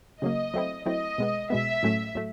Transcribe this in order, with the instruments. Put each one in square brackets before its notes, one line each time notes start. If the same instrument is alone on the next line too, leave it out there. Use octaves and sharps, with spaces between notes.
[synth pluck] C#3 F#3 A#3 [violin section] D#5
[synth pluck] F#3 A3 C4 E4
[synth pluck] F#3 A3 C4 E4 [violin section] D#5
[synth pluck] B2 G#3 B3
[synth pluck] B2 G#3 B3 [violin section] E5
[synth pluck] A2 F#3 A3 C#4
A2 F#3 A3